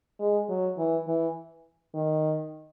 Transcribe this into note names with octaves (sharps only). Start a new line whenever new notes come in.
G#3
F#3
E3
E3
D#3